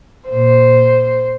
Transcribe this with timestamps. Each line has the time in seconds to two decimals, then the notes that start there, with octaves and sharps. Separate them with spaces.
0.29 A#2 C5